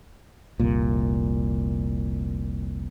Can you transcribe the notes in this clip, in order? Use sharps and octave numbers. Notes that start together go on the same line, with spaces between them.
F1 C2 A#2